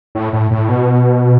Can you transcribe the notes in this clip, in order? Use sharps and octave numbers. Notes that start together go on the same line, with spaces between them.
A2
A2
A2
B2